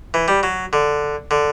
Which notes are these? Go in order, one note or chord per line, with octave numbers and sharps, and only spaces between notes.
E3
G3
F#3
D3
D3